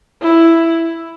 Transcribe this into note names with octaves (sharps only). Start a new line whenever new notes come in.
E4